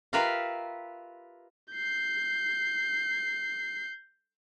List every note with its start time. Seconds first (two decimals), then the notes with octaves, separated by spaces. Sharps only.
0.13 F4 G4 A#4 B4 E5 F5
1.74 G6 C7